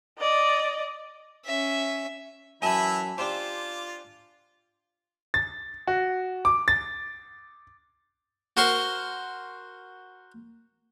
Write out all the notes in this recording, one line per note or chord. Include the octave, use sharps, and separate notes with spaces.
D5 D#5
C#4 E5
F#2 E3 E4 E5 G#5 A5
D4 F4 G4 C5 D6 E7 G7
A6
F#4
D6
A6
F#4 A#4 C5 C6 C#6